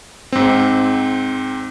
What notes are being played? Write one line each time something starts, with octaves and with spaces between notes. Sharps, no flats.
G#2 C4